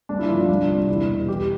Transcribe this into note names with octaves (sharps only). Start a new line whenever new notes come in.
G2 D4
E4
D3 F3 F4
E4
C2 D4
C3 G3
E2 E4
B2 G3
E2 G4